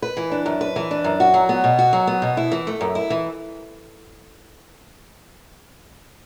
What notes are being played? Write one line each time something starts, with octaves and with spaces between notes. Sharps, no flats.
B4
E3
D4
F#2
B4
E3
D4
F#2
F#4
F#3
B3
B2
F#4
F#3
B3
B2
E4
E3
A3
F#2
E4
E3